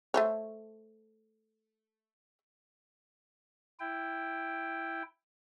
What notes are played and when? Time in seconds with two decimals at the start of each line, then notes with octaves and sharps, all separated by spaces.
0.14 A3 C5 C#5
3.80 E4 G5